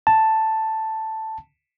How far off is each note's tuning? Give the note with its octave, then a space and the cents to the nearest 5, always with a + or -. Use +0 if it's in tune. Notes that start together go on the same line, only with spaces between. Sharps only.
A5 +5